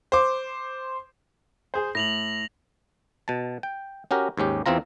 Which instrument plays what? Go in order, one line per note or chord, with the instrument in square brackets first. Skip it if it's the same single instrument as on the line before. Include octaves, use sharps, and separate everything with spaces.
[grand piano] C5 D6
[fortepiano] G#4 C5
[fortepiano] A2 [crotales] A#6 F7 F#7
[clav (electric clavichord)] B2 A5
G5
C#4 F#4 G4 A#4
D#2 G#2 C#4 G4
E2 E3 C4 F4 A#5